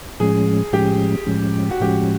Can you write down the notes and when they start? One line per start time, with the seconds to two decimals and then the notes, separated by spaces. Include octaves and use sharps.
0.20 A2 F3 G#3 C#4 G#4
0.73 A2 F3 G#3 C#4 G4
1.26 A2 F3 G#3 C#4
1.71 F#4
1.80 A2 F3 G#3 C#4 G4